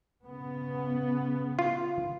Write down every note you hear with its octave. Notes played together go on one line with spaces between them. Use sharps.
C#3 B3
F4